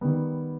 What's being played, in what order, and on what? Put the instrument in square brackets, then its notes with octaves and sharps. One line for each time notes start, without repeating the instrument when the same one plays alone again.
[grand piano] D#3 G3 B3